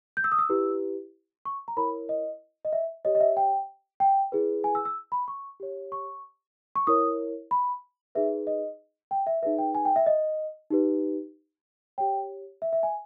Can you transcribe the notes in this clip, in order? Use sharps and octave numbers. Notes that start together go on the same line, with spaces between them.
G6
E6
D#6
E6
E4 G4 B4
C#6
A#5
E4 A#4 C#5 B5
D#5
D#5
E5
G4 C#5 D#5
D#5
E5
G5
G5
E4 G#4 B4
G#5
E6
E6
B5
C#6
G4 C#5
C#6
C#6
E4 A#4 C#5 D#6
B5
D#4 G#4 B4 E5
D#5
G5
E5
D#4 G#4 B4 E5
G5
G#5
G5
E5
D#5
D#4 G4 B4
G4 C#5 G5
E5
E5
G#5